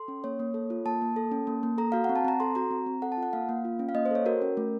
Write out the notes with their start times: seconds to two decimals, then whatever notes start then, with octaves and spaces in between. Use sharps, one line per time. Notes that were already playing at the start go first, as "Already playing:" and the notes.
Already playing: A4 C6
0.08 C#4
0.24 A#3 C#5
0.39 A#3
0.54 A4
0.70 F4
0.85 A#3 A5
1.02 A#3
1.16 A4
1.32 C#4
1.47 A#3
1.63 A#3
1.78 A4 A#5
1.92 F#4 F5
2.04 C4 F#5
2.16 A5
2.25 C4 A#5
2.40 A4 C6
2.55 F#4 A#5
2.71 C4
2.86 C4
3.02 A4 F#5
3.12 A5
3.17 F4
3.23 F#5
3.33 A#3 F5
3.49 A#3
3.65 F4
3.79 C#4
3.89 F5
3.94 A#3 D#5
4.05 C5
4.11 A4 C#5
4.26 F#4 A#4
4.42 C#4
4.57 A3